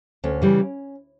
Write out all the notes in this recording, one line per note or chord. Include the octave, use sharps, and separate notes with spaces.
D2 C#4
C#3 E3 G3